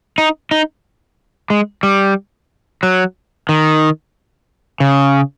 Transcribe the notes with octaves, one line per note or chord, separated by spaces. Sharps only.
D#4
D#4
G#3
G3
F#3
D#3
C#3